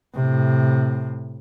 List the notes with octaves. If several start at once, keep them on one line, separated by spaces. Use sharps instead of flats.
A2 C3